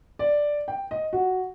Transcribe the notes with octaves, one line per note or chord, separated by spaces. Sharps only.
D5
G5
D#5
F#4